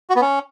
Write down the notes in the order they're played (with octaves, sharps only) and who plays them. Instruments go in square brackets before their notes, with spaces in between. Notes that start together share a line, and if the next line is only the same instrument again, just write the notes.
[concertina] F#4
B3
C#4